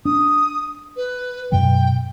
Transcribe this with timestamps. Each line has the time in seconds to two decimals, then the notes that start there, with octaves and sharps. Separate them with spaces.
0.05 D4 D#6
0.96 B4
1.52 F#2 B2 F#3 G5